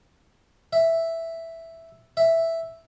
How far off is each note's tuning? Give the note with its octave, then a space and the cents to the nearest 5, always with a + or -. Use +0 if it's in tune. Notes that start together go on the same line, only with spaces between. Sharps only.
E5 +0
E5 +0